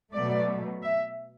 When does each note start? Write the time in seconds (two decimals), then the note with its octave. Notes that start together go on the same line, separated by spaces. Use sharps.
0.13 B2 F#3 A3 D5
0.83 E5